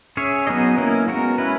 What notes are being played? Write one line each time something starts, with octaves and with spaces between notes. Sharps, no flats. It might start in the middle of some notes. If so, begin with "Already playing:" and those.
C#4 G#4 C#5 E5
F#3 B3 D#4 G#4 D#5
A#3 C#4 E4 A#4
G#3 B3 F#4 A#4
C#4 E4 B4